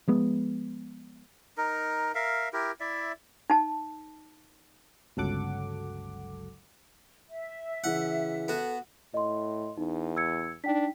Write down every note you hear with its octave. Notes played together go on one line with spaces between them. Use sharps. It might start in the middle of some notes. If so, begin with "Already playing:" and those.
F3 G#3 B3
D#4 A#4
A#4 E5 F5
E4 G4 A#4
E4 D5 E5
D#4 A5
G1 C#2 F#3 A4 F#5 D6
E5
C#3 E3 F#5 E6
B3 F#4 A4
A2 D#5 C6
E2 D#4
E6 G#6 C#7
D4 D#4 G5 B6